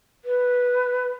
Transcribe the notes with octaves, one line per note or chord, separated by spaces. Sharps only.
B4